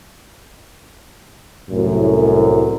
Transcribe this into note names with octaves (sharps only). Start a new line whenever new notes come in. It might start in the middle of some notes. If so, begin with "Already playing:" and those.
C2 F#2 A2